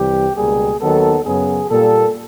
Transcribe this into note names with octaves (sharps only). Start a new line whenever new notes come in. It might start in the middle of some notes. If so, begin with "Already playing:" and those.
Already playing: C2 C3 E3 G3 G4
C#2 B2 G3 A#3 G#4
D#2 D#3 F#3 B3 A4
F#2 C#3 F#3 B3 G#4
A#2 G3 A#3 A4